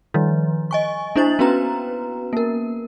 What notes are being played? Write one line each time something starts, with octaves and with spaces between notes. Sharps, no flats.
D#3 F3 G3
D#5 G#5 C#6
A#3 D4 E4 C5 A6 F#7
B3 C#4 F#4 B4 A#5
A#3 A#4